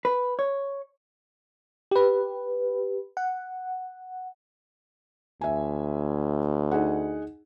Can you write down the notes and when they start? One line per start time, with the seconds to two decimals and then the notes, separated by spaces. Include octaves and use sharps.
0.05 B4
0.39 C#5
1.91 G4 B4
3.17 F#5
5.41 D2 E5 G#5
6.71 D#4 G#4 F#5